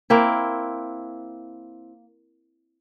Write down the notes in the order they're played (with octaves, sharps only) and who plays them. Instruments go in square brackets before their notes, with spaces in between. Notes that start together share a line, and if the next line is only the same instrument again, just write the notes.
[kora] A#3 C4 E4